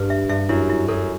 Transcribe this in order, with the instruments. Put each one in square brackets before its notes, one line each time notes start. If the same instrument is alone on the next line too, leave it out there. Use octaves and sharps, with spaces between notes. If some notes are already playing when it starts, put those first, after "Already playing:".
Already playing: [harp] G2 [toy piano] B4
[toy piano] E5
[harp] G2 [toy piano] E5
[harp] F#2 [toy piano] E4
[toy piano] E4
[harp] F#2 [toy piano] A4